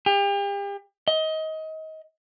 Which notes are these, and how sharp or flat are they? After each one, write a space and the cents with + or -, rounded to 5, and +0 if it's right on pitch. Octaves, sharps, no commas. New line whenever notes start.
G4 +40
D#5 +25